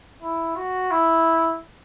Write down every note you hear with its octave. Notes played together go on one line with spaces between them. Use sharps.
E4
F#4
E4